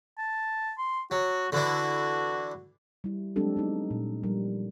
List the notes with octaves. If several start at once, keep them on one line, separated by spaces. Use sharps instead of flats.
A5
C6
F#3 F#4
D3 E3 D4 F#4
G3 E4
F#3 G#3 C4 D4 G4 A4
B3 C#4 D#4
A#2
F3 G3 A#4